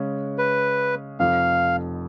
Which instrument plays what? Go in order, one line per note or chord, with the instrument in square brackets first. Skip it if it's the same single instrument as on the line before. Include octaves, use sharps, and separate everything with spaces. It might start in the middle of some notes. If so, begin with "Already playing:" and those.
Already playing: [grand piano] C#3 G#3 C#4
[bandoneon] B4
[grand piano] F1 F2 F3 [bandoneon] F5